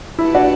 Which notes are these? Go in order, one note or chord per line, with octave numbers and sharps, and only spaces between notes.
E4 G4 B4 F#5 A5
D4 F#4